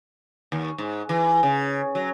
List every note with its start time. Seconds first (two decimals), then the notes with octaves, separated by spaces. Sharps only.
0.52 D#2
0.78 G#2
1.09 E3
1.43 C#3
1.95 F#3